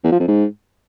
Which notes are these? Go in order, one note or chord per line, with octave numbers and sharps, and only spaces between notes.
E2
F3
F2
G#2